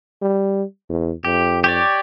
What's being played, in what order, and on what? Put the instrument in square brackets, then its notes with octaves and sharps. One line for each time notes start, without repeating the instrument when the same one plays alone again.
[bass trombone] G3
E2
[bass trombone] F2 [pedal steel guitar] G4
[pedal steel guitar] G4 C#5 D5